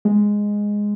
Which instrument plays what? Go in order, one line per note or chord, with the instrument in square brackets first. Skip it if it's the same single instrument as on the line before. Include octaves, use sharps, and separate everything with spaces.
[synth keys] G#3